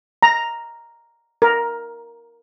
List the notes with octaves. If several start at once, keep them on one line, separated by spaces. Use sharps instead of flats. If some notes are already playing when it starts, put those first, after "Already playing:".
A#5
A#4